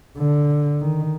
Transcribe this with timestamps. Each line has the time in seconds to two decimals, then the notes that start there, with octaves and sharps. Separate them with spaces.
0.18 D3
0.81 D#3